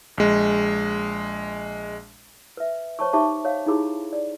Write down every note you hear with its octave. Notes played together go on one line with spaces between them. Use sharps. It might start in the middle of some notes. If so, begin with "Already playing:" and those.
A#1 G#3
B4 E5
C5 C#5 A5 C#6
D#4 G4 E5 A5 C#6 D6
C#5 F5
D#4 E4 G4 G#4 B5
D5